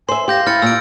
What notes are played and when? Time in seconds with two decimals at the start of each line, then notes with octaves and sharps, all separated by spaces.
0.09 C5 E5 G#5 C6
0.28 G4 F5 C6 G6 A#6
0.47 E4 F6 A6 C#7
0.62 A#2 E6 D7